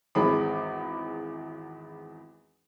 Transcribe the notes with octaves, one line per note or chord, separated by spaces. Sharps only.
G#1 E2 G#3 B5